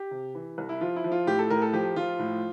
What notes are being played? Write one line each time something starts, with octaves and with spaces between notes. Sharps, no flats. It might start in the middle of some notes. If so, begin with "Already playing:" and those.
Already playing: G4
C3
E3
C2
E4
F3 F4
E4
F3
F4
A2 G4
A4
A2 A#4
A4
F3 G4
F3 F4
A2